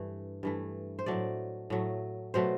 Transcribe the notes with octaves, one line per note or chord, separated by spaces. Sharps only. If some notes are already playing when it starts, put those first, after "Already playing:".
Already playing: G2 E3 A3
G2 E3 A3
C5
A2 F#3 A3 D5
A2 F#3 A3
B2 F#3 A3 C5